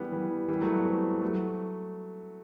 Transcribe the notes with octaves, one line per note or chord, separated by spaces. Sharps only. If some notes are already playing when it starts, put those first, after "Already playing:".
Already playing: E3 G3 B3
E3 G3
E3 G3
F#3 A3
G3 B3
A3 C4
G3
F#3 A3